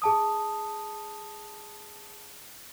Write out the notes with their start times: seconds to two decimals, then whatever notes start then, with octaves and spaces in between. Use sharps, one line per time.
0.02 G#4 A5 D#6